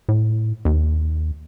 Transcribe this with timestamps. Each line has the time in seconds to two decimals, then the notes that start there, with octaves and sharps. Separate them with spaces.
0.09 A2
0.65 D#2